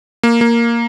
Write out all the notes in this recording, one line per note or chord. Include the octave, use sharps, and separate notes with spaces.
A#3
A#3